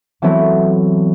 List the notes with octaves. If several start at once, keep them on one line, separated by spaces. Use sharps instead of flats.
E3 F#3 A3 B3 C4 E4